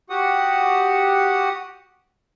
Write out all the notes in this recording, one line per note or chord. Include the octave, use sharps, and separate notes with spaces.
F#4 G4 F#5 D#6